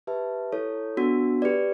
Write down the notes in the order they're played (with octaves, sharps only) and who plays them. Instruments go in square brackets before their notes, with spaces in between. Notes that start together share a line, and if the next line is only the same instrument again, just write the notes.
[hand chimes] G4 B4 E5 A5
E4 A4 C#5
B3 D4 F#4
G4 B4 D5